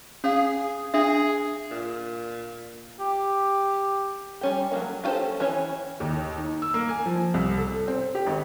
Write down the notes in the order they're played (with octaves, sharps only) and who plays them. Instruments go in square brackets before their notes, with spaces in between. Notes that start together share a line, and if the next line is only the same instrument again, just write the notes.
[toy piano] C#4 F5 [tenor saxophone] G#4
[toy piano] D4 E5 [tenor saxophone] G#4
[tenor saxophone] A#2
[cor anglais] G4
[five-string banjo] G3 C#4 G4
F#3 A3 A#3
C#4 F4 G4 A4 C5
E3 C#4 C#5
[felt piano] D#2
D#4
E6
A#3
G#5
F3
C2
A4
C4
G4
G#1